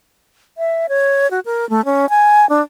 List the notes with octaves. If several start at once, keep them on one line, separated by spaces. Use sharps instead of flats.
E5
C#5
F#4
A#4
A3
C#4
G#5
D4